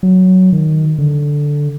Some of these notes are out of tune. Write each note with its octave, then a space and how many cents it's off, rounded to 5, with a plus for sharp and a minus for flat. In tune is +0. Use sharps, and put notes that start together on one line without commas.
F#3 +5
D#3 +5
D3 -5